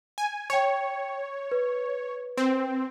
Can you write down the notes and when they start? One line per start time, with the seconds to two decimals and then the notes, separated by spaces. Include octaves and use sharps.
0.18 G#5
0.50 C#5 G5 C#7
1.52 B4
2.37 C4